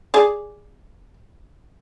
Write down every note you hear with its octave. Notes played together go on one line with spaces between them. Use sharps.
G#4 D5